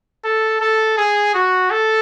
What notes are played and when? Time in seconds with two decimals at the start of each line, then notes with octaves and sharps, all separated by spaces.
0.24 A4
0.61 A4
0.97 G#4
1.34 F#4
1.71 A4